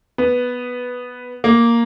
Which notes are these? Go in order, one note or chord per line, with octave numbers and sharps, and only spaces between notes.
B3
A#3